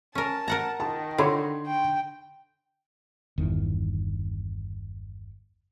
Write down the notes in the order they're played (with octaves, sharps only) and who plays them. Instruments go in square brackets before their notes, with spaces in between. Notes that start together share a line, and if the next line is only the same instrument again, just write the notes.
[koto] C#4 A#4 [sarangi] A5
[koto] A#4 F#5 A#5
[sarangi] D#3 [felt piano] A5
[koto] D3 [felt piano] C#5 B5 C6
[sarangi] G5
[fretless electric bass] G1 E2 D#3